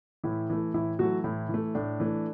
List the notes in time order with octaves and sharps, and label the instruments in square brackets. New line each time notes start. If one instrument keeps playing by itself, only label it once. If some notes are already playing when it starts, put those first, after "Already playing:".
[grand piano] A2 E3 E4
E3 A3
A2 E3 E4
E3 F#3 A3 F#4
A2 E3 E4
E3 A3
A2 D4
E3 A3